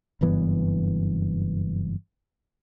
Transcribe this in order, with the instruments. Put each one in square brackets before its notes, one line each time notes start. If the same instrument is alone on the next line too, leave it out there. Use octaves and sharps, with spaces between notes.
[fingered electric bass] F#1 G2 E3 B3